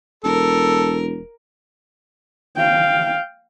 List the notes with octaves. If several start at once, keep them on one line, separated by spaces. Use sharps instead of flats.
E1 A4 A#4
F5 G5